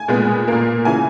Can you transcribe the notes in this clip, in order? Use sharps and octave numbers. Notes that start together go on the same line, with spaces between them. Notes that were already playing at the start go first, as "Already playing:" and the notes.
Already playing: G#5
A#2 G#3 B3
A#2 A#3
C#3 E3 G#5